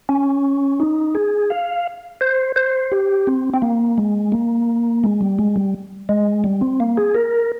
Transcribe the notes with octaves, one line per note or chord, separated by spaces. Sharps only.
C#4
D#4
G#4
F5
C5
C5
G4
C4
C4
A#3
G#3
A#3
G#3
G3
G#3
G3
G#3
G3
C4
A#3
G#4
A#4